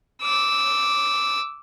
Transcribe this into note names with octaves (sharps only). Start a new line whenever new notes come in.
D6 E6